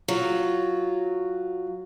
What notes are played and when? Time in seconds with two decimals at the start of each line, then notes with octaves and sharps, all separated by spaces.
0.08 F#3 F4